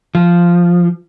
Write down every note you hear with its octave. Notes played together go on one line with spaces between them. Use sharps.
F3